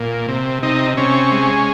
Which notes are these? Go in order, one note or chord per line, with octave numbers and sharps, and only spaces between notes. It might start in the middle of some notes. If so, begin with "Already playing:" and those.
Already playing: A#2
C3
C3 D#4
C3 C#4
G#3